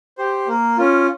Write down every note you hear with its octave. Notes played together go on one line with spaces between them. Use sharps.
G4 C5
A#3
C#4 F4